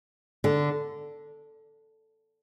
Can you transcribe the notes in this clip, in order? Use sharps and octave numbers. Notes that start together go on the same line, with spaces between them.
D3